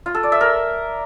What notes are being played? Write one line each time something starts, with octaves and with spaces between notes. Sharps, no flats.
F4
A4
D5
E5
A#4